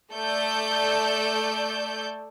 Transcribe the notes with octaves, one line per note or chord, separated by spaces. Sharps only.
A3 A4 D5 G6